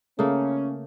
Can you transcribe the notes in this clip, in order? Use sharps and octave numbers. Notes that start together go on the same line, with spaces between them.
C#3 A3 A#3 C#4